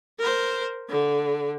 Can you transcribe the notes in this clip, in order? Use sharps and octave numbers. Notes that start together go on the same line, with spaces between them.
A#4 C5
D3